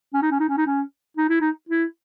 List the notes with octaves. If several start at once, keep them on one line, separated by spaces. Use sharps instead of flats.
C#4
D#4
C#4
D#4
C#4
D#4
C#4
D#4
E4
D#4
E4